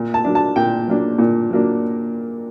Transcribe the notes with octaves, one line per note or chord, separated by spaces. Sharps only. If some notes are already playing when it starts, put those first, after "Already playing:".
Already playing: A#2
A5
F#3 A#3 D4
A5
A#2 G5
F#3 A#3 D4
A#2
F#3 A#3 D4